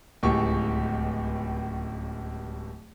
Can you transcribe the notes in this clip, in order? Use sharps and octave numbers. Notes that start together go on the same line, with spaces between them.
D1 C#2 A2 G4 G#4 C#6